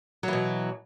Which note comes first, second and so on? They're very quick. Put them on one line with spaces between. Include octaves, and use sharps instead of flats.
F#3 E3 B2